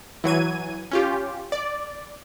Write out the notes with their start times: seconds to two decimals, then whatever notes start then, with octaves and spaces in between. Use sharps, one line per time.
0.24 E3 F#3 G#6 D#7
0.91 C#4 F4 G4
1.52 D5